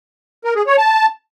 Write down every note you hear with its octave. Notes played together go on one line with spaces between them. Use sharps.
A#4
G#4
C#5
A5